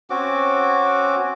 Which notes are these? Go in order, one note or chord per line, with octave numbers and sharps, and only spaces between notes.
C4 C#4 F#4 D6